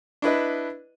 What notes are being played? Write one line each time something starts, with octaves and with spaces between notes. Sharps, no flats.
D4 E4 B4 D#5